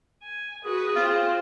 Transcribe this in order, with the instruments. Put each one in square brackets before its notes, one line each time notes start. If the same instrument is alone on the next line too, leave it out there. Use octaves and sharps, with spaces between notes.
[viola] G#5
[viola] F#4 B4 [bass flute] G#4 [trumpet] D#6
[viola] C4 [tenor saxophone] F4